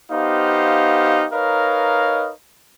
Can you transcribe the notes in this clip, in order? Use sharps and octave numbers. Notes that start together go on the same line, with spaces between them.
B3 D#4 G4 C5 F5
D#4 A#4 B4 C#5 D#5 F5